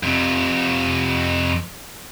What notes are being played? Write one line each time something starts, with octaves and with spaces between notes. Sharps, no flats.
F2 C3